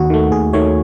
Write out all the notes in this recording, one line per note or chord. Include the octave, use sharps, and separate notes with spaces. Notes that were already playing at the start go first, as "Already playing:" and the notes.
Already playing: D#2 F#4
D#3 A3
D#2 G#4
D#3 A3 C#5